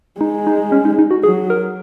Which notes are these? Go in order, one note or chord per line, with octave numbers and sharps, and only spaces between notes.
G#3 D#4
D#4
C#4
D#4
D#4
F#4
F#3 G#4
A#4